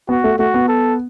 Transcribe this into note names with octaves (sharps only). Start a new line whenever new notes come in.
B3 F#4
A3
A3 F#4
B3
A4